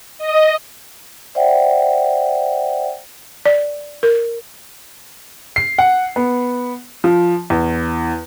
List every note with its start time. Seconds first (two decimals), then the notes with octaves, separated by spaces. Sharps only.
0.18 D#5
1.35 C5 D5 E5 F#5 G5
3.45 D5
4.03 A#4
5.56 C7
5.78 F#5
6.16 B3
7.04 F3
7.50 E2